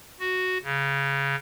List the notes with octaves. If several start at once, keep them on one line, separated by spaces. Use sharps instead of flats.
F#4
C#3